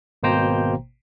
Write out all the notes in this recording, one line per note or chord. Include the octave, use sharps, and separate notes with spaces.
G#1 B2 A#3 C5 G5 A#5